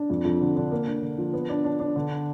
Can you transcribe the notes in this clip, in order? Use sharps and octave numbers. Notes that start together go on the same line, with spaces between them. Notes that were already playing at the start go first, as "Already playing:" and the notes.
Already playing: D4
F2
F2
D3
D3
A#3
D3
D3
F3
B3
D4
D4
D4
D3